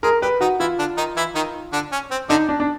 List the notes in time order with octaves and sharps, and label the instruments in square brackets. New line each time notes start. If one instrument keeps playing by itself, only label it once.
[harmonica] G#3 G#4 [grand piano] A#4
[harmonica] G3 G4 [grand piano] B4
[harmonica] D#3 D#4 [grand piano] F#4
[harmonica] E3 E4 [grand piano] F4
[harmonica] D3 D4
D#3 D#4
E3 E4
D#3 D#4
D3 D4
C#4
C4
[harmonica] D3 D4 [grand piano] D#4
[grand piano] D4
D4